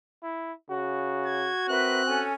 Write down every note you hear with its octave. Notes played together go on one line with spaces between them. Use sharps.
E4
C#3 F#4
G#6
C4 A#4 B4 E5 F#6
C#4 A4 G#5